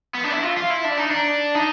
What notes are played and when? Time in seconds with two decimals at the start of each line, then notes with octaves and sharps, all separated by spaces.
0.14 B3
0.24 D4
0.32 E4
0.42 F4
0.57 F4
0.70 E4
0.84 D4
0.97 D#4
1.10 D4
1.55 D#4